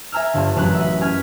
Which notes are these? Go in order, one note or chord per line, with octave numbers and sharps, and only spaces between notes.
E5 G#5 A#5 E6 F6
G1 G2 D3
A1 F#2 D3 F#6
D#5 E5 F#5 B6
C#4 G#5 F6 B6